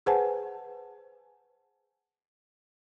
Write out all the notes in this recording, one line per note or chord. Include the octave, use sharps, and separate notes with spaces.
G#4 B4 C5 F#5 G#5 A5